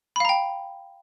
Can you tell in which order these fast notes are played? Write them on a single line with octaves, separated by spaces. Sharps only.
B5 F5 A#5 G5